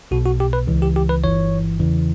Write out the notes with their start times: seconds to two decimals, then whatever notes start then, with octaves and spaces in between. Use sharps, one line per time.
0.11 B1 B2 F#4
0.26 F#4
0.40 G4
0.53 B4
0.67 C#2 C#3 E3
0.82 G4
0.96 G4
1.09 B4
1.24 G1 G2 E3 C#5
1.79 E2 C#3 E3